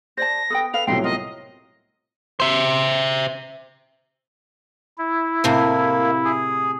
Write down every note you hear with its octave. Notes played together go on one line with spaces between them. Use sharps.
C5 D5 A5 A#6
A4 B4 G5 D#6
A4 B4 F5 F7
C2 A2 F#3 A4 D#5 G5 C6
F4 A#4 D#5
C5 E5
E4
A2 C3 A#3 C5
G#4